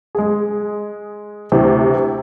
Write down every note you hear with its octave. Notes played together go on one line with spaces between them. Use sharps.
G#3 G#4
D2 C3 E3